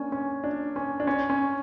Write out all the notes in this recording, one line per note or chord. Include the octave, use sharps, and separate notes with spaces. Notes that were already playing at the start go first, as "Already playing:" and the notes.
Already playing: A#3 C#4 D4
C#4
D4
C#4
D4
C#4
C#4